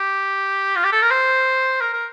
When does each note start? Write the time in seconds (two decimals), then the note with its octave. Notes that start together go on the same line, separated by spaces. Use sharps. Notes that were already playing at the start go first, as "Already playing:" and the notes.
Already playing: G4
0.76 F4
0.84 G4
0.93 A4
1.02 A#4
1.11 C5
1.81 A#4
1.93 A#4